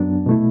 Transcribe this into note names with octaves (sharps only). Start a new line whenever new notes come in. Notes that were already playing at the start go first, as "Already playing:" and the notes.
Already playing: F#2 F#3 B3 D4
B2 A3 E4